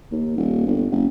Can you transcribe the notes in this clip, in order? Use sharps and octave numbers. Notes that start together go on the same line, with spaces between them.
D#2
D#1
G1
F#1